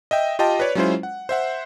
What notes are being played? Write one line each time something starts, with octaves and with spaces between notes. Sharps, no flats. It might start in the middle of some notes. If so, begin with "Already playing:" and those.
D#5 E5 G5
F4 G4 D#5 G5 A5
B4 C#5 D5
F#3 G#3 C#4 E4 F4 C5
F#5
C5 E5 F#5